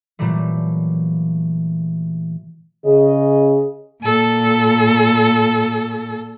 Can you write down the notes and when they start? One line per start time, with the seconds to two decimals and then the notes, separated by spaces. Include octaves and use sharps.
0.19 A#2 E3 F#3 G3 A3
2.86 C#3 G#4 D#5
4.02 A#2 A4